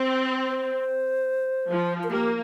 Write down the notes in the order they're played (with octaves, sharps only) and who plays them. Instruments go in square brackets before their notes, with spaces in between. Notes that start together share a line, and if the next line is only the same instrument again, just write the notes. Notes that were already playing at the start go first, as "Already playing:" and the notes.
Already playing: [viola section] C4 [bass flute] C5
[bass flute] C5
[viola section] F3
[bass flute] A#4
[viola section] A#3 [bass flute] G4